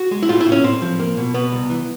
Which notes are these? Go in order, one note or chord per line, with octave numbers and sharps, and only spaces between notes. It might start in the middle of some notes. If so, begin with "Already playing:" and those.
Already playing: F#4
G#3
E4
A2 F4
E4
A2
C#4
A2 C4
F3
A#3
B2
B2 B3
C2
E3